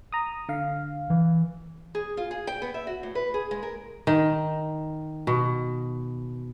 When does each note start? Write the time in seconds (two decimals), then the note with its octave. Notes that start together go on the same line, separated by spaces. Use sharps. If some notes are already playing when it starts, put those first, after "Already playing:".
0.12 A#5 D#6
0.49 D3 F5
1.10 E3
1.95 G#4
2.17 F4
2.31 G#4
2.47 G5
2.62 B3
2.74 E5
2.87 F#4
3.03 A2
3.15 B4
3.34 G#4
3.51 G#3
3.63 A#4
4.07 D#3
5.27 B2